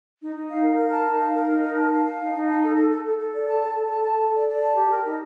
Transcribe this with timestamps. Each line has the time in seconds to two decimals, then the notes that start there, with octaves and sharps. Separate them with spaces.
0.20 D#4
0.35 D#4
0.48 F5
0.62 A#4
0.77 A#4
0.92 A5
1.06 D#4
1.20 F5
1.34 A#4
1.49 D#4
1.62 A#4
1.77 A5
1.92 F5
2.05 F5
2.20 D#4
2.34 D#4
2.48 A5
2.62 A4
2.76 A4
2.91 A4
3.05 A4
3.19 A4
3.34 D5
3.48 A5
3.63 A4
3.77 A4
3.90 A5
4.05 A5
4.19 A4
4.34 D5
4.48 D5
4.62 A5
4.76 G4
4.91 A#4
5.05 D#4